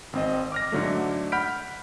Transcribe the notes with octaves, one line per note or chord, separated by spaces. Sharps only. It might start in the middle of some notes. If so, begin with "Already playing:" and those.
G#1 C4 D#5
D6 F6 A#6
G#2 D3 F#3 A3
F#5 B5 F6 G6 B6 D7